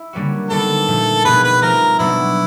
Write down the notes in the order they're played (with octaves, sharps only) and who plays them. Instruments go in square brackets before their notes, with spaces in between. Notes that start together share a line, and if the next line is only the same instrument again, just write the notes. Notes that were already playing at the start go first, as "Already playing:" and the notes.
Already playing: [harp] E4
D3 G3 A#3 C#4 F#4
[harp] D#3 G3 B3 D4 [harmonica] A4
[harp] A#2 F3 A3
[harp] B2 G3 B3 D#4 G#4 [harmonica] B4
[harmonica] B4
[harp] F3 A3 C4 F4 [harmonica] A#4
[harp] B2 F#3 B3 D4 F#4 [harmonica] E4